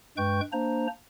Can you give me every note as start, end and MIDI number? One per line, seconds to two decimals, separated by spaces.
0.17 0.41 43
0.17 0.41 56
0.17 0.41 71
0.17 0.41 79
0.17 0.41 85
0.17 0.41 91
0.53 0.87 58
0.53 0.87 62
0.53 0.87 72
0.53 0.87 82